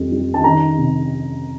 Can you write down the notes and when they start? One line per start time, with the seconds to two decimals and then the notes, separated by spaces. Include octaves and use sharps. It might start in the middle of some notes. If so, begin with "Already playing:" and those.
Already playing: F2 G3
0.12 G3
0.34 A5
0.44 D#3 A#5
0.78 C3